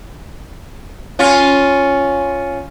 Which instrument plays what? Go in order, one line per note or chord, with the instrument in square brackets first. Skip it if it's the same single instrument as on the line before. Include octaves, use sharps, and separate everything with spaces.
[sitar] C#4 F4